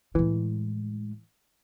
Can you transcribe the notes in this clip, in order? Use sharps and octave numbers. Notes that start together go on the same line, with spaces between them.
A2 E3 G#3